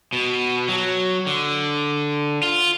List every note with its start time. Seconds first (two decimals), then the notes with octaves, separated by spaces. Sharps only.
0.13 B2
0.69 F#3
1.27 D3
2.43 F4